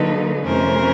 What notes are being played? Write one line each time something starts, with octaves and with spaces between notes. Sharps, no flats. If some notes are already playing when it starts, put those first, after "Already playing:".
Already playing: D3 F#3 A#3 D#4 A4 B4
F2 C3 E3 A3 C#4 A#4 C5